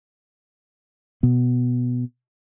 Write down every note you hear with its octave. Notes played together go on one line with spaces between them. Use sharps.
B2 B3